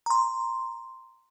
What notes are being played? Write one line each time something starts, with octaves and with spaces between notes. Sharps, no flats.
A#5 C6